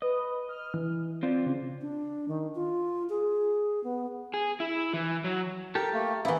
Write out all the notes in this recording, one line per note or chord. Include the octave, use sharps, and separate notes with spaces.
B4 D#5
F6
E3
C4 F4 D5
C#3
D4
D#3
F4
G#4
B3
G#4
E4
E3
F#3
G4 A4 A#4
A3 A#3
E3 A#3 B3 E4